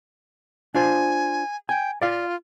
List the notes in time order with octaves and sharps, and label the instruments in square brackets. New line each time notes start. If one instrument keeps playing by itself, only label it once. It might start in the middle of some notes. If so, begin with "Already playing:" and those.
[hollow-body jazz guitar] D4 F4 C5 [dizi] G#5
[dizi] G5 [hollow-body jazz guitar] G#5
[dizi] F4 [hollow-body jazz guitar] D5 F5